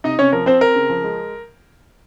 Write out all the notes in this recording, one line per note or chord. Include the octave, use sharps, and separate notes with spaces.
C3 D#4 D#5
C3 C#4 C#5
F3 A#4
C4 C5
C4 A#4
C#3
F3
G#3